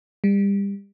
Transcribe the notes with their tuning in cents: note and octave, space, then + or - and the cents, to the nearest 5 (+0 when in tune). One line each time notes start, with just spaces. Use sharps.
G3 +30